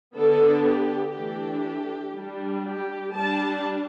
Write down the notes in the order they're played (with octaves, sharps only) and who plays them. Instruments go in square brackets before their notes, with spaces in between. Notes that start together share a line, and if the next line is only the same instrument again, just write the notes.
[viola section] D3 B3 D4 A4
G4
E3 A3 D4 G4
G3 D4
G4
G3 D4 A5